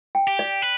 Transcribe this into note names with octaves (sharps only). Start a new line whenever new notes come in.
G5
G4
D5
B4